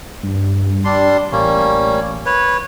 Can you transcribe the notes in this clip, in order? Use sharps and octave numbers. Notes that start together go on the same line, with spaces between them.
G2
G3 D4 C6
A1 G3 A#3 C#4
B4 C#5